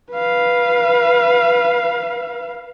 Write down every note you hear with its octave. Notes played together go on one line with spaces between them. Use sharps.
B4 F5